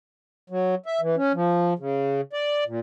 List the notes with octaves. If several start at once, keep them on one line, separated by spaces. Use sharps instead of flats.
F#3
E5
E3
C#4
F3
C#3
D5
A#2